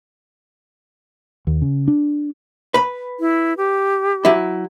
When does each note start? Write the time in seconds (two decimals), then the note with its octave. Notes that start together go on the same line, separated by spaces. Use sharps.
1.47 D#2
1.62 C#3
1.88 D4
2.74 B4 B5
3.20 E4
3.57 G4
4.25 F#3 E4